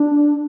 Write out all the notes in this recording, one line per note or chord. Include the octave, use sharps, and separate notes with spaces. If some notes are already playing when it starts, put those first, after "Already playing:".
Already playing: D4